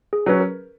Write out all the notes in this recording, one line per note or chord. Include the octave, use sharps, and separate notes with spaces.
G#4
F#3 C#4 B4
A#4